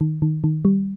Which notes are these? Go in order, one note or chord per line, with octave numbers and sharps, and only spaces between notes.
D#3
D#3
D#3
G3